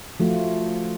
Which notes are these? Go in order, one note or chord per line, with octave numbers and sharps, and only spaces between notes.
F3 A3 F4 F#4